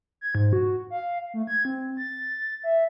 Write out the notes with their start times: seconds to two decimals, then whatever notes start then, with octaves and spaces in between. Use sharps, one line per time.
0.21 G#6
0.35 G#2
0.53 F#4
0.90 F5
1.34 A3
1.47 G#6
1.65 C4
1.97 A6
2.64 E5